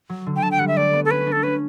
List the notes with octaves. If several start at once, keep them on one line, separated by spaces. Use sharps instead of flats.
F#3
D3
G5
F#3 A5
G5
G3 F#5
E5
A3 D5
B3
A4
C#4 B4
D4
A4
C#4 B4